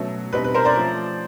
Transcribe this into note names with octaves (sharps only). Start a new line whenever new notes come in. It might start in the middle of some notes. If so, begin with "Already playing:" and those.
Already playing: B2 F#3 A3 C#4
B2 G3 C4 D#4 B4
B4
A#4 C5
C5 D5
F3 A3 C#4